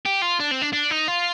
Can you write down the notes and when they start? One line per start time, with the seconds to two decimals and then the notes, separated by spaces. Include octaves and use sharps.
0.06 G4
0.22 F4
0.40 D4
0.51 C4
0.62 D4
0.73 D4
0.91 D#4
1.08 F4